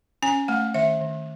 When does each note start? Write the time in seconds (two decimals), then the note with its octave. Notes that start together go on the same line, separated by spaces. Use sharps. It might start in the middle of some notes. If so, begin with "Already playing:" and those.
0.22 C#4 G#5
0.48 A3 F#5
0.74 D#3 E5
1.01 D#3